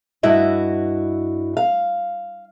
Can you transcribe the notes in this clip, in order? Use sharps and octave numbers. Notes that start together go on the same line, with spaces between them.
G2 E4 F#4 D#5
F5